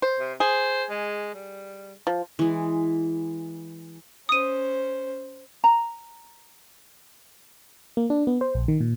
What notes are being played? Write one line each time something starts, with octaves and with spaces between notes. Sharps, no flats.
C5
C3
G#4 C5
G#3
G3
F3
E3 G#3
C#4 C5 D#6 D#7
A#5
A#3
D4
B3
C5
A#1
D#3
A#2